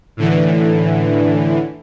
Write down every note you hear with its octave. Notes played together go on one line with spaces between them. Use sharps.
A2 D3 E3